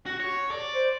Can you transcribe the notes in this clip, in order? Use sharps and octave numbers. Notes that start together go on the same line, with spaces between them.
F#4
C#5
D5
C5